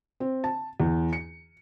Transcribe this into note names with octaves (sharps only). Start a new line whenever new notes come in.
C4
A5
E2
C#7